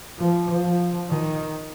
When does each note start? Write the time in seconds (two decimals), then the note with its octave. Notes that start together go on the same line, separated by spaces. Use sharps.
0.18 F3
0.65 F3
1.10 D#3